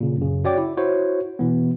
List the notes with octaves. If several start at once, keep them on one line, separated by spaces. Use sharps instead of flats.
A#2 C#3
F#2 C#3
F#4 C#5 D5 G5 D6
E4
E4 F#4 C5 C#5
B2 E3 B3